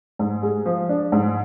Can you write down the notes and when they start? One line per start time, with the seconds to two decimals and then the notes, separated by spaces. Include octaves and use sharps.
0.19 G#2
0.43 G#3
0.66 F3
0.89 D4
1.12 G#2